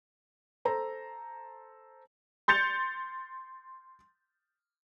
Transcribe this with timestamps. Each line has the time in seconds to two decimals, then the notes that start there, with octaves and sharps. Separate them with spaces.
0.65 A4 C5 A#5
2.48 C6 G6 A6 C#7 F7